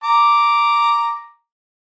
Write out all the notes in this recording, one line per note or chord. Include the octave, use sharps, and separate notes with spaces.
A#5 D6